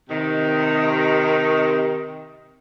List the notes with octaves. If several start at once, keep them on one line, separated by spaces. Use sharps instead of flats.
C3 D#3